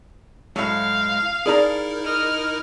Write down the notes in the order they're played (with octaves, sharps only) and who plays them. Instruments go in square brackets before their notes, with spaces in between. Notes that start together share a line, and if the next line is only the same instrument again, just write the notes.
[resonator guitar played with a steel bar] A2 F#3 [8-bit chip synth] G#3 [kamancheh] F5
[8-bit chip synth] D#4 E4 A#4 [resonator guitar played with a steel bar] G#4 D5 A#5
[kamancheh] D#5 F6